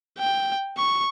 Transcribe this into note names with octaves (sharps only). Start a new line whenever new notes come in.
G5
C#6